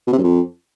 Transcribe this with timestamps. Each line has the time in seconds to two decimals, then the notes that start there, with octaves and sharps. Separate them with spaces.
0.07 B2
0.13 C3
0.18 F#2
0.24 F2